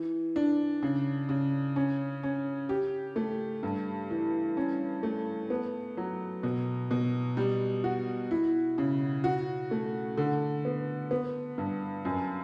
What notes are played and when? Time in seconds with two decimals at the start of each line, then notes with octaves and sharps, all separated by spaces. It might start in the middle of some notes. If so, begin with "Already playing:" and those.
Already playing: E3
0.36 D4
0.83 C#3
1.29 C#3
1.76 C#4
2.23 C#4
2.69 G4
3.16 A3
3.63 G2
4.11 E3
4.57 C#4
5.03 A3
5.50 B3
5.97 F#3
6.43 B2
6.91 B2
7.37 G3
7.84 F#4
8.31 E4
8.78 C#3
9.24 F#4
9.71 A3
10.18 D3
10.65 B3
11.11 B3
11.58 G2
12.05 F#2